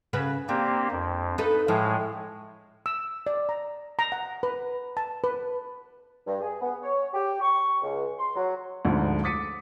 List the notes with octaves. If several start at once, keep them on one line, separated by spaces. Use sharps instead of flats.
C#3 F#4 B4
A#3 C4 D4 G4
F2
D#4 A4 B4
A2 F3 G#3
E6
D5
A#5
A#5
F#5
B4
A5
B4
G2
G#4
B3
C#5
G4
C#6
C#2
C6
F#3
D2 G#2 D3 F3
D6 D#6 A6 B6 C#7 D#7